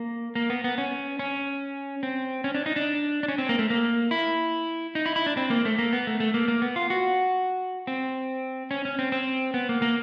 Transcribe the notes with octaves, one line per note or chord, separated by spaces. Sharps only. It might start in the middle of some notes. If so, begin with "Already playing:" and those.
Already playing: A#3
A#3
B3
B3
C#4
C#4
C4
C#4
D4
D#4
D4
D4
C#4
C4
A#3
A3
A#3
E4
D#4
E4
E4
D4
C4
A#3
A3
A#3
B3
A3
A3
A#3
A#3
B3
F4
F#4
C4
C#4
C#4
C4
C4
B3
A#3
A#3